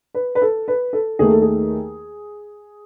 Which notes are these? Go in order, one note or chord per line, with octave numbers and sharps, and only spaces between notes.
B4
B4
A4
B4
A4
D#2 D#3 A3 G#4
A4
G#4